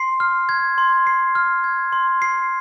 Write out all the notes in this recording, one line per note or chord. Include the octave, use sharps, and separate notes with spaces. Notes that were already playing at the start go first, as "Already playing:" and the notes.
Already playing: C6 C7
F6
G#6
C6
C7
F6
G#6
C6
C7